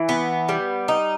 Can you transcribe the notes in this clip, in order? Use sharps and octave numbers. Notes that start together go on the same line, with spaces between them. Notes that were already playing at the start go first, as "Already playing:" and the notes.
Already playing: E3
B3
G3
D#4